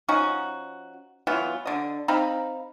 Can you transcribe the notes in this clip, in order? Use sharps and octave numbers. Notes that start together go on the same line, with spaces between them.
F3 C#4 D#4 F#4
E3 F#3 B3 F4
D3 D#5
C4 D#4 F5 B5